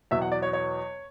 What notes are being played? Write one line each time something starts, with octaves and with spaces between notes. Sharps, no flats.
E2 B2 F#3 E5
F#5
D5
C#5
C#5